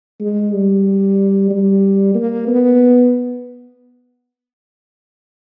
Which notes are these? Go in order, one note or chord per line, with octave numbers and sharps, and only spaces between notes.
G#3
G3
G3
A#3
B3